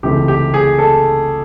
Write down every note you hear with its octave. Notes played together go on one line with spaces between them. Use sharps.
C#2 C3 E3 A3 G4
G4
G#4
A4